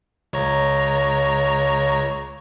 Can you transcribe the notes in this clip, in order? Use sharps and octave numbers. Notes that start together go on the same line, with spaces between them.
C#2 C#5 A#5